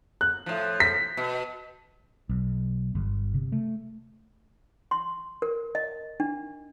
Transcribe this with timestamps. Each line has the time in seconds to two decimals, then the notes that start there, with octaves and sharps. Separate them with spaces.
0.21 F#6
0.46 A2 F3
0.80 B6
1.17 B2
2.29 B1
2.95 G1
3.34 C3
3.52 A3
4.91 C6
5.42 A#4
5.75 D#5
6.20 D4